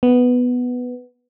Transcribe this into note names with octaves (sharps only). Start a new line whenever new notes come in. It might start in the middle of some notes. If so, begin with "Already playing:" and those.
B3